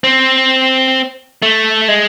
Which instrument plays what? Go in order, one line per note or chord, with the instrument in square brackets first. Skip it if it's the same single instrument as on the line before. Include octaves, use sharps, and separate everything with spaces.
[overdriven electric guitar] C4
A3
G#3